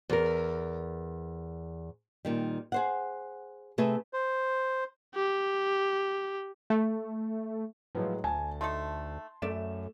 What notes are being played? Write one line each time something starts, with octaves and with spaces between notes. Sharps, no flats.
E2 A#4
A#2 D#3 G3
G#4 C5 F#5
C3 A3 G#4 B4 E5
C5
G4
A3
A2 F3 F#3 G#3 B4
D2 G#5 A5
A3 D#4 A4 C6
F#2 A3 D5 E5 E7